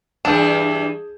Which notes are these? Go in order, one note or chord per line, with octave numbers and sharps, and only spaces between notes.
G2 E3 D4 G#4 G6 E7